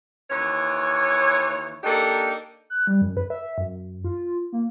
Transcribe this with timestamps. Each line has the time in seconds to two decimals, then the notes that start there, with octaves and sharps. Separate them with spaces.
0.30 D#2 E3 C#5
1.84 A#3 D4 D#4 G4 A4
2.70 F#6
2.87 G3
3.02 F#2
3.17 B4
3.30 E5
3.58 F#2
4.04 F4
4.53 A#3